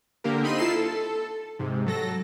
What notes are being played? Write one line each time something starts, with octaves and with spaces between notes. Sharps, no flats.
D3 A#3 G4 A#4
C4 D#4 B5 C6 D#7
E4 F4 A4 C7 E7
A4
G#2 C3
F#3 A4 A#6